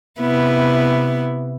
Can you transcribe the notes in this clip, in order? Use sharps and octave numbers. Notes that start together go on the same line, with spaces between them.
C3 B3 E4